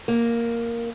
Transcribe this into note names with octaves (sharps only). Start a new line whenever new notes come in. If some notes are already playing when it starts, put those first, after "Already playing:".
A#3